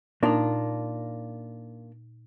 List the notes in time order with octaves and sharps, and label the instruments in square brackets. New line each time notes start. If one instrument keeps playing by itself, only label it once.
[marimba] A#2 D#4 [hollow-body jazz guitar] A#3 D4 F4